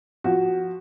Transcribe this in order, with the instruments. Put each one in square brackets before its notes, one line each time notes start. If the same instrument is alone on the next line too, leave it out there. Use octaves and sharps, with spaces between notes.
[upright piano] F3 F#4